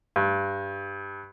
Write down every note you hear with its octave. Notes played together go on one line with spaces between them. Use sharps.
G2